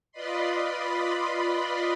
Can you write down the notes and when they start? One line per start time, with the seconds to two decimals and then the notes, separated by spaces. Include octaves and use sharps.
0.12 F4 B4 D5 D#5 B5 C6